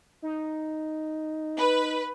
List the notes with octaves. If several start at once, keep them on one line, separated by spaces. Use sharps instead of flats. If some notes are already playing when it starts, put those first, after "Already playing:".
D#4
B4